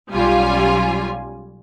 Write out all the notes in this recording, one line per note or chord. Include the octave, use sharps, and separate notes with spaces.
B1 G3 C#4 F4 G#5